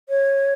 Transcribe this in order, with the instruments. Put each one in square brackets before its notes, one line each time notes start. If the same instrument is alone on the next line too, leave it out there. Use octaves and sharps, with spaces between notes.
[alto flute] C#5